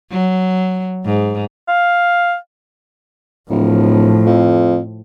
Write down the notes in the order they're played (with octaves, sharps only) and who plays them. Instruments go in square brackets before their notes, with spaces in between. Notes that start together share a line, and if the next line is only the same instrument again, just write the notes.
[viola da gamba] F#3
G#2
[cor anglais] F5
[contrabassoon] D1 [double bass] A2 F3
[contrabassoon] F2